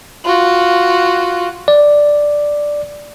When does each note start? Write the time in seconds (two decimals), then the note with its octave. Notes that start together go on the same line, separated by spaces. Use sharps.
0.24 F4 F#4
1.68 D5